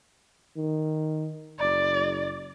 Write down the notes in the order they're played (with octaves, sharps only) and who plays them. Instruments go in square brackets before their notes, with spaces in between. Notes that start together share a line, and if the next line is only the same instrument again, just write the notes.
[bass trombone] D#3
[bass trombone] F#1 [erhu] D5